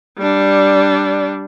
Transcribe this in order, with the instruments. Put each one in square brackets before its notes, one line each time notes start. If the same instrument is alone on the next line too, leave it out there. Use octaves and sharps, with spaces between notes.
[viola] G3 D4